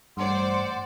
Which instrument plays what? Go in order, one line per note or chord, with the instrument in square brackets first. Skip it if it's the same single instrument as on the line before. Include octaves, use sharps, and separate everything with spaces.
[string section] A1 C5 D5 [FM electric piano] G2 [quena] F#5 [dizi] C6